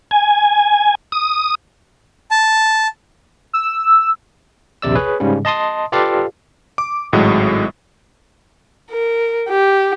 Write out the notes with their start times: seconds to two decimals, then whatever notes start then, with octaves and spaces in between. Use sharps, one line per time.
0.11 G#5
1.12 D#6
2.31 A5
3.53 E6
4.82 A#1 D#2 C3 D5 E6
4.95 G#4 B4 C#5
5.20 G#2 C#3 G3 C#4
5.45 D#5 A5 C6 D#6
5.92 F4 G4 A4 B4 D5 F5
6.78 D6
7.13 G#1 A2 F#3 G#3 D#5
8.91 A#4
9.49 G4